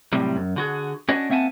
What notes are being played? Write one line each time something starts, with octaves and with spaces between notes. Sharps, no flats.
A2 C3 F#3 G3
F#2
D3 F#4 G#4
C#4 D4 F#4 C#5 D#5
A#3 C4 E5 F#5 G#5 A5